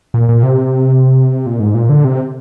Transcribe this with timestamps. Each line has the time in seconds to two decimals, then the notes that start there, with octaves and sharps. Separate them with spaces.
0.14 A#2
0.29 A#2
0.43 C3
1.46 A#2
1.60 G#2
1.75 A#2
1.89 D3
2.05 C3